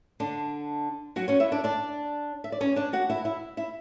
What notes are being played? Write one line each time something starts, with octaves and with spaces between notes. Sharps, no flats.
D3 D4
F#3 F#4
C#4 C#5
E4 E5
D4 D5
D4 D5
E5
D5
C#4 C#5
D4 D5
F#4 F#5
E4 E5
E4 E5
E4 E5